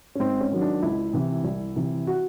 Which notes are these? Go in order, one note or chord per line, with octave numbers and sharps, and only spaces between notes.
C#4
G#2 C4
C#4
D#3 F#3
D4
C#2 E4
C3 E3
C2
C3 E3
F#4